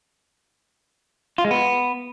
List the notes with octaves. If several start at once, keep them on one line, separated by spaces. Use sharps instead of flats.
F4
G#3
B3